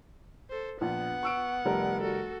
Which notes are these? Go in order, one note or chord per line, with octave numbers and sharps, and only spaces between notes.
A4 C5
A#1 B3 F#5
C#6 E6 D7
F1 G3 A#4
F#4 A4